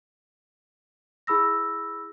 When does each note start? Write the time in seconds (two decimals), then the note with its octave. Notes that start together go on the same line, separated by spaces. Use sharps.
1.27 E4 G#4 B5 E6 A#6